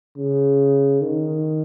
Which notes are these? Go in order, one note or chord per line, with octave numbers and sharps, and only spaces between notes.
C#3
D#3